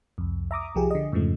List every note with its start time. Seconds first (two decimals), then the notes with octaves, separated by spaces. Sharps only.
0.18 C2 F2
0.51 E5 A#5 D6 D#6
0.75 C2 F3 G4 G#4
0.91 D3 D#5
1.12 F2 G#2 C#3 F3 A3